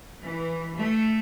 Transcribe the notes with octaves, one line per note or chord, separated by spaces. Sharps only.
E3
A3